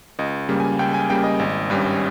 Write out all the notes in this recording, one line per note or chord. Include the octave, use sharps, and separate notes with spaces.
C#2 D#5
C#3 G3 A#3
G#5
C#2 G5
G#5
C#3 G3 A#3 G5
D#5
G#1
G2 G3 C#4